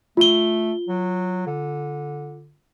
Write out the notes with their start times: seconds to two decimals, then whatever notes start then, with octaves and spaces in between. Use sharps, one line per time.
0.17 A3 F4 G7
0.89 F#3
1.46 D3